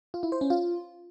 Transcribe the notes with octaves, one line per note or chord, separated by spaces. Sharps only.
F4
E4
C5
C#4
F4